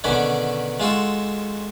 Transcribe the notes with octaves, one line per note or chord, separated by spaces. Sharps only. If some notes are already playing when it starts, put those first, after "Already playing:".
B2 D3 D#3 C#4 B4
G#3 F4 F#4 A4